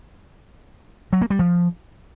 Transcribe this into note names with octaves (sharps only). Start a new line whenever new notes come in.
F#3
A#3
G3
F3